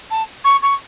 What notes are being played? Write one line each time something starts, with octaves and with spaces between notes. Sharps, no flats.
A5
C#6
C#6